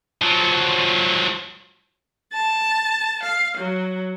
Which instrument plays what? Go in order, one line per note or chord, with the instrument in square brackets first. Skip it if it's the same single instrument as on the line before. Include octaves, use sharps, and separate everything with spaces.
[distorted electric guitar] F3 F#3
[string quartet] A5
F5
F#3